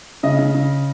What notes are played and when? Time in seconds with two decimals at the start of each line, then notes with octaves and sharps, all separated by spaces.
0.23 C#3 D#5
0.39 C#3
0.55 C#3